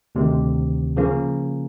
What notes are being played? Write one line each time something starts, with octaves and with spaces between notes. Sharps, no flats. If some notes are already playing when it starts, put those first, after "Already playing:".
D2 C3 D#3
C#3 F3 A#3 C#4